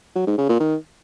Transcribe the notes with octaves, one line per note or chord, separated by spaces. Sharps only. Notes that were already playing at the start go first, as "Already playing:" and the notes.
F#3
G#2
C#3
A#2
D#3